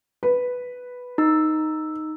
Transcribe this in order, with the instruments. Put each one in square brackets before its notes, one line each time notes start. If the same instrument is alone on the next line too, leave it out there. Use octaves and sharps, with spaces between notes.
[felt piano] B4
[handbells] D#4 E6